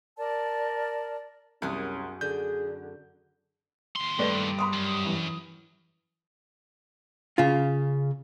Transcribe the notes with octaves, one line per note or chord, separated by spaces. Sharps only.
A#4 D5 A5
C2 F#2 B3 C#4 G#4
D3 G#4 G6
D#2 C6
G2 A3 B4 D5
B5 C6 D#6
F#2
E3
C#3 F4